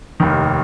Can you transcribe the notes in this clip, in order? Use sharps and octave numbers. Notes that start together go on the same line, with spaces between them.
F1 D#2 D#3